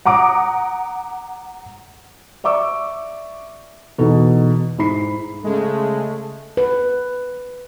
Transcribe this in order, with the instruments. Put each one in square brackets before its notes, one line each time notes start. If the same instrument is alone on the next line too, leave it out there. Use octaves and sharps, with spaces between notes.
[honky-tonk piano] F#5 A#5 D6 D#6 D7
[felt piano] D5 E5 C#6 D6 E6
E2 B2 D#4 A4
G#2 E4 B5 C7
[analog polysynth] C#3 G#3 [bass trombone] A3
[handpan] B4